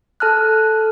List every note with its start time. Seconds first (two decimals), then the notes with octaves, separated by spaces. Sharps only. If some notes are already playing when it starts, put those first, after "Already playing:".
0.20 A4 A5 F6 F#6